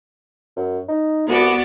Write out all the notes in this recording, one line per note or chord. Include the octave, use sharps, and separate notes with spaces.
F#2
D#4
C2 B3 F#4 D5